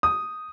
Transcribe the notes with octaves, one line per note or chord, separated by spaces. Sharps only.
D#6